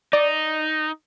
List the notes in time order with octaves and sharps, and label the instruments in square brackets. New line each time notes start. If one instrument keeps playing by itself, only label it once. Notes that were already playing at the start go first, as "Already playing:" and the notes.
[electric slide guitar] D#4 [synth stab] D5